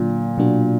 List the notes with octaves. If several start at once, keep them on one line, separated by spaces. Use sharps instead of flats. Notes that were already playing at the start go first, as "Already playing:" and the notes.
Already playing: A#2 D3 F#3 A#3 D4
B2 F#3 A#3 D4 F#4